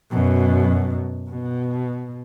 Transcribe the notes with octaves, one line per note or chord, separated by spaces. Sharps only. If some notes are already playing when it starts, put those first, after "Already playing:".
F#2 B2
B2